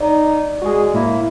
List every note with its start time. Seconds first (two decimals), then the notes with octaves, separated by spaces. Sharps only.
0.01 D#4 D5
0.62 G#3 F#4 G#4
0.94 A2 A#3 E4